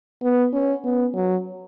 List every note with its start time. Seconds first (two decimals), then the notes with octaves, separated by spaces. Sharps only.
0.23 B3
0.53 C#4
0.84 B3
1.15 F#3